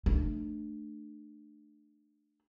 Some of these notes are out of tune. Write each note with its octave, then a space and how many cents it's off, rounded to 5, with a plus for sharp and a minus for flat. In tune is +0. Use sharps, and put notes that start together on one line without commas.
A3 +0 D4 +25